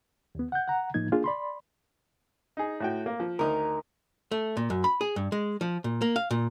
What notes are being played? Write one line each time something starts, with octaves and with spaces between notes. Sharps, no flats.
D#2 B3
F#5 G6
F#5 A#5
A2 F3 A#3 D#4 G#6
A#3 D4 F4 G#4
D5 B5 C6
D#4 G#4
A2 F#4 G5
A#3
F3
D2 D#4 A#4
A3
A#2
F#2
B5
G#4
G2
G#3
F3
A#2
A#3
F5
A#2